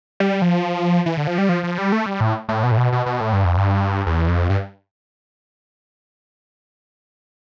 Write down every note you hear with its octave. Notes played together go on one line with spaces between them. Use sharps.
G3
F3
E3
D3
F3
G3
F3
F3
G3
A3
G3
A2
A2
B2
A2
B2
B2
B2
A2
G2
F2
G2
E2
F2
G2